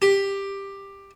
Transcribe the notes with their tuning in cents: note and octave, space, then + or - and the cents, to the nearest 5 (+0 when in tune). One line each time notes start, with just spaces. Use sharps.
G4 +10